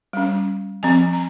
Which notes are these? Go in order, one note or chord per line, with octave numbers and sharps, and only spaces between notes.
G3 C#4
F3 C4 G#5
A#5